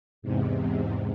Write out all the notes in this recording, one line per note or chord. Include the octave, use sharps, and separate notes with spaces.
E2 G#2 C3